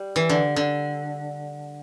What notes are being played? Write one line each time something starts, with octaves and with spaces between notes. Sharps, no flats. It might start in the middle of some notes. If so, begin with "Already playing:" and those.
Already playing: G3
E3
D3
D3